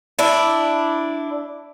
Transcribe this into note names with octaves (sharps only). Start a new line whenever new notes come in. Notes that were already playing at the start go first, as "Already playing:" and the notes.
D4 E4